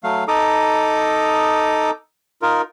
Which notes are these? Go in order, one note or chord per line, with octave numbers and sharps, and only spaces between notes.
F#3 A3 F5
D#4 A4 A#5 D6 D#6
D#4 F4 A#4